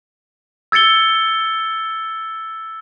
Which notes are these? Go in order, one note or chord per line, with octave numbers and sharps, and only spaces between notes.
E6 G#6 A6 C#7 G7